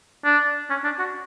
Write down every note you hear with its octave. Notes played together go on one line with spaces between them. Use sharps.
D4
C#4
D4
F#4